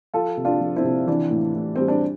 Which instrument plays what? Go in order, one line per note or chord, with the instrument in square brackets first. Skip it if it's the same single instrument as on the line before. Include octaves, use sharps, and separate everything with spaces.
[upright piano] F3 F4 A4
C3
D4 F4
F3
C4 E4
C3
E3 D4
A2
A2
G3 C4
D4